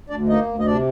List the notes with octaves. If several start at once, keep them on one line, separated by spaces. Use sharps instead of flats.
D2 D4 D5
A#3 D#4 D#5
D2
D#5
C3 D4 D5